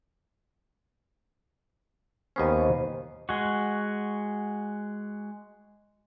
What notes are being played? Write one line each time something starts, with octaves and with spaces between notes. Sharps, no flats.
D#2 B3 C#4 C5 D#5
G#3 F#4